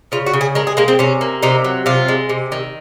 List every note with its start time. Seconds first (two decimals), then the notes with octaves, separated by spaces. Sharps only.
0.12 C#3 F4
0.26 F#4
0.33 C#3
0.41 G#4
0.55 G#3 A#4
0.67 G#4
0.77 G#3 A#3
0.88 C4
0.99 C3 C#4
1.21 A#3
1.43 C3 D#4
1.64 F#3
1.86 C3 F4
2.08 G#3
2.29 C3
2.52 D#3